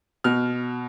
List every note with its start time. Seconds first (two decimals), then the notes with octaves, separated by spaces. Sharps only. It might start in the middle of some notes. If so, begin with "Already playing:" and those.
0.24 B2 F6